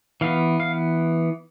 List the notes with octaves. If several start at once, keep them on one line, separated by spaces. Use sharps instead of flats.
E3 B3 F5
F5